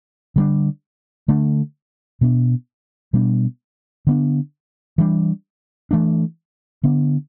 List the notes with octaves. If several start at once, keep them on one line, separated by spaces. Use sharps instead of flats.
D3 G3 D4
D3 A3 D4
B2 B3 D4
B2 G3 B3 D4
D3 B3 D4
E3 G3 D4
E3 A3 D4
D3 B3 D4